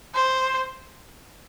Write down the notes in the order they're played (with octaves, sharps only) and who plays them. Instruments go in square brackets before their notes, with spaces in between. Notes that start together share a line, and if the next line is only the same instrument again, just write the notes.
[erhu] C5